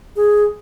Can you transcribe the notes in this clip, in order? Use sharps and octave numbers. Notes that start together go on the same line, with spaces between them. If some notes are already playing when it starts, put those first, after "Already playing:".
G#4